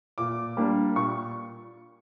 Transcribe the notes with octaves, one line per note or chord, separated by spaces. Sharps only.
A#2 D6
G3 A#3 D4
A#2 C#6